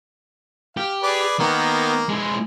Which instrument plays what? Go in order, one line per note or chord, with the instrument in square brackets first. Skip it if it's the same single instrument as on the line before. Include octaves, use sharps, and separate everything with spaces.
[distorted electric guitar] G4 [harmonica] F5
[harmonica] G#4 B4 D5
[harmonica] D#3 A#3 [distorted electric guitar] B3
[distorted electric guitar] G#3 E4